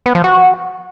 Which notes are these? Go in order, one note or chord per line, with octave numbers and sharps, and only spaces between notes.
B3
F3
F#4